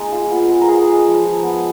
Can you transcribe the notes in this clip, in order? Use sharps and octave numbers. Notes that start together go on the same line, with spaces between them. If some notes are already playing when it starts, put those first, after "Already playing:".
Already playing: G#3 A#3 D#4
F4
B3
G#3
A#4
B3 G#4
G#3
F3
F3
B3